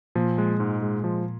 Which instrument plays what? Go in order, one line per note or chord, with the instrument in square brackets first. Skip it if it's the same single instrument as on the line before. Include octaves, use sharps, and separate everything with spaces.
[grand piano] A#2 [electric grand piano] F3
[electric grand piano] G#3
G#2
G#3
F3